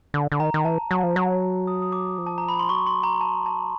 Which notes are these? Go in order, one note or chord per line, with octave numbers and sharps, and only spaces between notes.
D3
D3
D#3 A#5
D#3
E3 A5
F#3 A5
F3
F#3 A#5
D#6
D#6
D6
F3
A5
A#5
B5
C6
F#3 C#6
C6
A#5
A5
A5